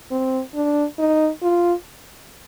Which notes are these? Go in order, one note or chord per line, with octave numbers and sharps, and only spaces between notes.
C4
D4
D#4
F4